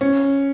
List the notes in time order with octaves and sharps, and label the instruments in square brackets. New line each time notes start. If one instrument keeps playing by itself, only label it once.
[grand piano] C#4